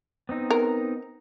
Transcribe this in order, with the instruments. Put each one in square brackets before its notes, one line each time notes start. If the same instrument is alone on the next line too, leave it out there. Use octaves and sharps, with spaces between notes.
[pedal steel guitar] B3 C4 D#4
[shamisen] A#4